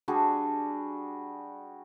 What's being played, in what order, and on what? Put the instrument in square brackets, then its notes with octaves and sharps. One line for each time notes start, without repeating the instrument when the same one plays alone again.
[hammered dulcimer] G3 D4 F#4 G#4